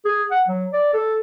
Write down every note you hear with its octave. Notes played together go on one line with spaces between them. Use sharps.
G#4
F#5
F#3
D5
A4